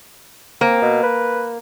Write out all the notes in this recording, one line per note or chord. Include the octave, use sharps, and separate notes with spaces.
A#3 C4
B2
B4